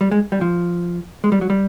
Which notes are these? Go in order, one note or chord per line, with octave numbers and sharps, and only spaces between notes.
G3
G#3
G3
F3
G#3
G3
F#3
G3